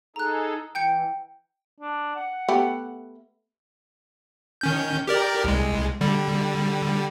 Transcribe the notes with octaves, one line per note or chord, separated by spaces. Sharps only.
D#4 G#4 A4 A#5 F#6
E3 G5 G6 C#7
D4
F#5
A3 B3 G4
D#3 C#4 G6
G4 A#4 D5
C2 G#3
D3 G3